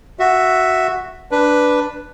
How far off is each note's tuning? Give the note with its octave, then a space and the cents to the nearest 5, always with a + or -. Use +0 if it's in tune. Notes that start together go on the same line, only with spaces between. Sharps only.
F#4 +0 E5 +0
D4 +0 B4 +0